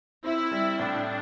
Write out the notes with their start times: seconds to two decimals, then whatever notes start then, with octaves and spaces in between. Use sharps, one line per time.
0.24 C4 E4
0.51 G3
0.79 A2 D4